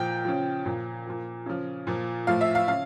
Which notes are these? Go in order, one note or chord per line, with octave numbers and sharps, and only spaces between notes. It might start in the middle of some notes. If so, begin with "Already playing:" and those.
Already playing: A#2 F3 G5
C#3 F3
A#2 F3
A#2 F3
C#3 F3
A#2 F3
A2 F3 F5
E5
F5
C#3 F5